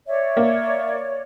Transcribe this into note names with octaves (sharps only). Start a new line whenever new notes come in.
C#5 D5 E5
A#3